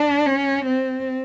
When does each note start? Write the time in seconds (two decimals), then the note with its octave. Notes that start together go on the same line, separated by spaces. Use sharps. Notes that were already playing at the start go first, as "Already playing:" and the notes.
Already playing: D4
0.26 C#4
0.66 C4